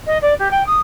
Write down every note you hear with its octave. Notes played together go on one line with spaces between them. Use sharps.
D#5
D5
G4
G5
D#6